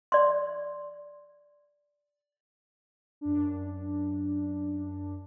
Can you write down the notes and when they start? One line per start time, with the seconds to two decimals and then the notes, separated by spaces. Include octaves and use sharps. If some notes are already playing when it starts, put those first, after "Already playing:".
0.12 D5 C6
3.21 F#2 D4